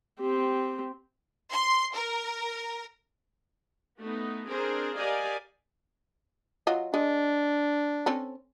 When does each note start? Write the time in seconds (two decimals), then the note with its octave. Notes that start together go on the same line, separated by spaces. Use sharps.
0.20 C4 G4
1.51 C6
1.93 A#4
3.98 A3 B3 D#4
4.48 C4 D4 G#4 A#4 C5
4.96 G4 A#4 D5 D#5 F5 G#5
6.67 F#3 F4 D#5
6.94 G#3 D4
8.06 C4 C#4 A4